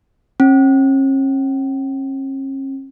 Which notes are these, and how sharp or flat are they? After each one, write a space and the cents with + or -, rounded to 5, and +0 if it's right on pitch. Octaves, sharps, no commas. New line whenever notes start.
C#4 -45